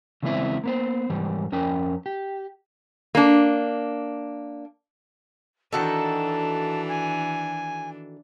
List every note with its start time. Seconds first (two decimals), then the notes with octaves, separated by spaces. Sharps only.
0.23 C#3 E3 G#3 B3 C4 E4
0.64 A#3 B3 C5
1.10 G#2 E3 G3
1.52 F2 C#4 A#4 G5
2.06 G4
3.15 A#3 D4
5.73 D#3 E3 D4 F#4 A4 A5
6.88 G#5